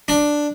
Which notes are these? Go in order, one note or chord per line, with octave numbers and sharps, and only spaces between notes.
D4